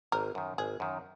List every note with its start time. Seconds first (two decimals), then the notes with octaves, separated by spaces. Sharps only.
0.12 G#1 A#4
0.35 F#2 D#3
0.58 G#1 G#4
0.80 F#2 D#3